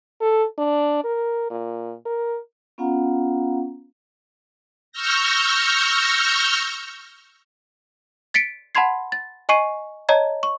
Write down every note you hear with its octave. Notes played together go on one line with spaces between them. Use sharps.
A4
D4
A#4
A#2
A#4
B3 C#4 F4 F5 F#5 A#5
C#6 E6 F6 G6 A#6
A6 B6 C#7 D7
F#5 A5 B5 C6 G#6 C7
A6
D#5 G#5 C#6 C7 D#7
C#5 D#5 A5 A#5 G#6
C#6